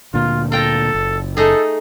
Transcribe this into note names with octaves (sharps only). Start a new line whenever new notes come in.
D2 A#2 D3 F4
F4 A4 G5 A#5
F#1
A3 D#4 G#4 A4